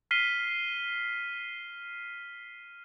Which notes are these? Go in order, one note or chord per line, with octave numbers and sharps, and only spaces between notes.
F6 B6 C7 D#7 G7